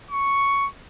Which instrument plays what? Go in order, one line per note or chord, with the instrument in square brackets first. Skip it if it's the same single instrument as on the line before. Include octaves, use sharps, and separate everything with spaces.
[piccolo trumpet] C#6